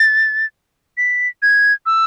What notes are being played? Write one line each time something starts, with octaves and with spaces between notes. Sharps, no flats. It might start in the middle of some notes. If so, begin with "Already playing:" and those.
Already playing: A6
B6
G#6
E6